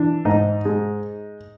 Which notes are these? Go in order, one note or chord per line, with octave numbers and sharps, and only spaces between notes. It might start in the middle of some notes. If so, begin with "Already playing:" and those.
Already playing: E3 D4
G#2 D#4
G#3